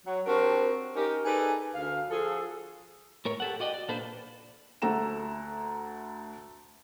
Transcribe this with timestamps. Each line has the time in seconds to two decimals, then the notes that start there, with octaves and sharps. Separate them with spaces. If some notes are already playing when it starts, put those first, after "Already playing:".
0.06 F#3
0.26 C4 D4 F#4 G4 A#4
0.96 C#4 D#4 G4 A#4
1.25 D#4 G#4 A4 B4 D5
1.75 D2 F5
2.10 F3 F#4 G#4 A4
3.25 A2 A#4 C#5
3.40 G4 A4 F#5
3.60 F#4 D5 D#5 G5
3.74 D5
3.88 A#2 A#3 D4 A4 B4 C5
4.82 D2 A3 A4 F#5 A#5 E7